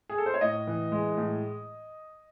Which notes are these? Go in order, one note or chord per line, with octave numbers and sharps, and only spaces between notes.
G#4
A4
C5
C#5
A2 D#5
E3
G#3
A2